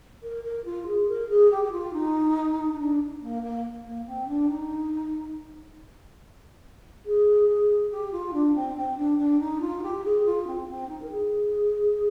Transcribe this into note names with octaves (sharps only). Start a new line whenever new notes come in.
A#4
A#4
F4
G#4
A#4
G#4
G4
G4
F4
D#4
D#4
D4
A#3
A#3
A#3
C4
D4
D#4
G#4
G#4
G4
F4
D4
C4
C4
D4
D4
D#4
F4
G4
G#4
F4
C4
C4
D#4
A#4
G#4